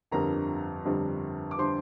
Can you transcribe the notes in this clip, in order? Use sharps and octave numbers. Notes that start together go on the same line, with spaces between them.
G1 F2 D3 G3 A#4 A#5
G1 F2 D3 G3
D6
D3 G3 C5 C6